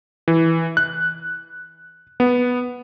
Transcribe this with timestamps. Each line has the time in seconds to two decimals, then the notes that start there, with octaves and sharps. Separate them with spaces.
0.28 E3
0.77 F#6
2.20 B3